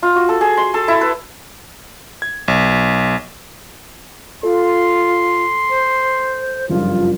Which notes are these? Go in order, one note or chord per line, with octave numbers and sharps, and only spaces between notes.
F4
F#4
A4
G#4
C6
A4
E4
B4
G#6
B1
F4 A4 C6
C5
F#1 G2 F3 F4